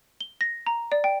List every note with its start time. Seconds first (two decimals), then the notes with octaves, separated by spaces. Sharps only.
0.21 G7
0.41 A#6
0.67 A#5
0.92 D5
1.04 G5